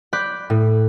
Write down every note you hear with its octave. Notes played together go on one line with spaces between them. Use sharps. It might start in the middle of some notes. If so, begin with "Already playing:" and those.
D5 B5 F#6 G6
A2